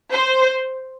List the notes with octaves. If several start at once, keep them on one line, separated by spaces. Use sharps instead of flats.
C5